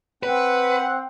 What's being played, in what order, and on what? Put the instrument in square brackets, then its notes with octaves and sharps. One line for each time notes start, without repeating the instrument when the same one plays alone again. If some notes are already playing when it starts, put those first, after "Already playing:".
[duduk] C4 [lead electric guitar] B4 [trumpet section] F#5